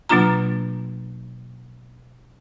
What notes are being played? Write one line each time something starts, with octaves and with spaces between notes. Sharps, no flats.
B2 F#3 A#3 D4 F4 A#5